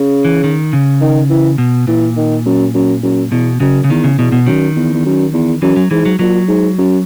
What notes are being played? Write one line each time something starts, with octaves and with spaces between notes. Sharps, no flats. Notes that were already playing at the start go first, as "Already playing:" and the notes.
Already playing: C#3
E3
D#3
C#3
D#3
E3
B2
A#2 E3
D#3
F#2
F#2
F#2
E2 B2
F#2 C#3
C#3
E2 D#3
C#3
E2 B2
B2
F#2 D#3
E2
E2
F#2
E2
F#2 E3
F#3
G#2 E3
F#3
A#2 F#3
G#2
F#2